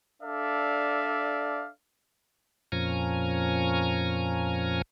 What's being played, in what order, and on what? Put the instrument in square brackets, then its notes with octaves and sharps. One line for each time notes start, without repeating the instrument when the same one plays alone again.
[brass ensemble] D4 A4 D5 E5 F5
[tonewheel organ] F2 A#2 F3 C#4 G#5 A#5